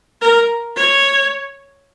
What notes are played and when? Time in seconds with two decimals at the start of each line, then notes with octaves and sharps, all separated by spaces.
0.22 A#4
0.76 C#5